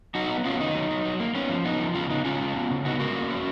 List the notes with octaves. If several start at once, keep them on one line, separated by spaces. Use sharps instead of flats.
F#3 D#4 F#4
B3
B3 C#4 F4
D#3 D#4
F#3
F#3
F#3
A#3
B3 C#4
F3
B3 D#4
F3
C#3 C#4 F4
B3 D#4
C#3 C#4 F4
G#3
B3
C#3
B3 D#4 F#4
G#3 F#4 A#4
A#3
C#4